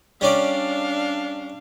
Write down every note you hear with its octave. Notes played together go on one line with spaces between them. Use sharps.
G3 C#4 D4 D5 F5